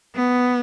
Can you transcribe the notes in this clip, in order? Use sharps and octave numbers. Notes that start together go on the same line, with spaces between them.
B3